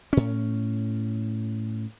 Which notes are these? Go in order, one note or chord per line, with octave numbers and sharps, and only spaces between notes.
A2 C#4